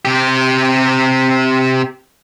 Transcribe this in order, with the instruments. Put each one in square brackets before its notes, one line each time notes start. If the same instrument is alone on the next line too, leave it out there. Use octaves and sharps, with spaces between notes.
[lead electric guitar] C3 G4